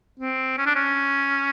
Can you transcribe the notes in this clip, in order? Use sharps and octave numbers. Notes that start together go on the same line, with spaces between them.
C4
C#4
D4
C#4